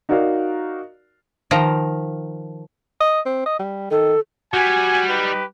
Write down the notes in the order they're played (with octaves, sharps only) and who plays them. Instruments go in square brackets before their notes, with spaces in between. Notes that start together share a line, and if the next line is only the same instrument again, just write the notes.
[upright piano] D#4 F#4 A#4 D5 F5
[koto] D#3 F3 A#5
[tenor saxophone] D#5
C4
D#5
G3
[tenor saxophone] D#3 [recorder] A4
[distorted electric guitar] G3 [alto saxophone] F#4 [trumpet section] G#5
[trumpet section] D#4 G4 B4